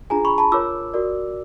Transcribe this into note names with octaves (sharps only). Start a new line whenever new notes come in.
D4 F4 G#4 G#5 A#5
B5 C#6
A5 B5
F4 A#4 C#5 D6 E6
F#4 A#4 D5